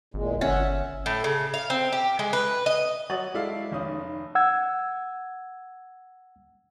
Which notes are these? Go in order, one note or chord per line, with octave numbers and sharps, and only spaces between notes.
G#1 E2 A#2 G#3
G1 C#4 E5 F#5
A2
C#3
F5
C4
G4
G#3
B4
D#5
F#3 F#4 C#5 D#6 A6 F#7
G#3 E4 A4 D5 E5 F5
F1 D#3 C#4 D#6
F#5 E6 G#6